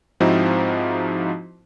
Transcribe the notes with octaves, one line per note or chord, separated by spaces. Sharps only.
G#2 F3 C4 D#4 E4 F#4